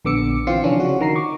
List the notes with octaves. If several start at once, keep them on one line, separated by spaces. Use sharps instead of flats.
A#1 D3 B3 D6 E6 C#7
E3 C4 F4 C7 C#7
C3 E3 F3 C#4 D4 F4
C#3 F#4
D#3 A#5 C7
C#6 D6